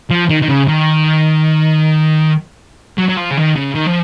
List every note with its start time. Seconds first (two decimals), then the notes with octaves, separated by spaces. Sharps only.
0.10 F3
0.30 D#3
0.42 D#3
0.49 C#3
0.68 D#3
2.98 F#3
3.09 F#3
3.17 F3
3.31 C#3
3.37 D#3
3.55 C#3
3.75 D#3
3.86 F3